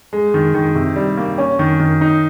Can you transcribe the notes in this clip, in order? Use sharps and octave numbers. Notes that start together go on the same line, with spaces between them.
G#3
D#3
D#3
C3
G3
A#3
C#4
D#3
D#3
D#4